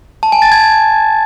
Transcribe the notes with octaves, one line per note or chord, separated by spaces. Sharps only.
A5
G#5
A6
G#6